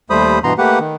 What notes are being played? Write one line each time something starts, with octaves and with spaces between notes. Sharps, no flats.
D#2 G3 A3 C5 B5 D#6
G2 B2 E3 B3 A#5 C6
A3 A#3 G4 B4 F#5
D#3